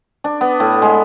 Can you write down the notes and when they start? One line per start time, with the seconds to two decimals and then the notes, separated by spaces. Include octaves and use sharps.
0.24 D4
0.41 B3
0.60 A2
0.82 G#3